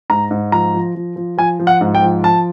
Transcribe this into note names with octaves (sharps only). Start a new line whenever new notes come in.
G#2 A#5
G#2
F3 A#5
F3
F3
F3
F3 G#5
F3
F#5
G#2
G5
F3
F3 A5